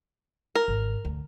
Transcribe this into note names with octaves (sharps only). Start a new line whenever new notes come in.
A#4
G#1
D2